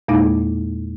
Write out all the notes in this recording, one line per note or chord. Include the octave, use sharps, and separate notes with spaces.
E2 A#2 G#3 A#3 D#4 E4